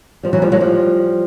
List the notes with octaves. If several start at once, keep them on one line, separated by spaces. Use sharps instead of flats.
F3 G3
E3 F#3
F3 G3
F#3 G#3
F3 G3